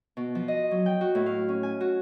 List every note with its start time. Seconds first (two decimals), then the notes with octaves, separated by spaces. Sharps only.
0.17 B2
0.35 F3
0.48 D#5
0.71 F#3
0.86 G5
1.01 F#4
1.15 A2
1.26 F5
1.48 C#4
1.63 G#5
1.81 F#4